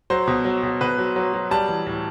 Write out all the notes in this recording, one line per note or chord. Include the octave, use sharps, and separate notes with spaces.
F#3 C5
B2
F#3
B2
B2 B4
F#3
F#3
F#3
G3 A5
E3
A2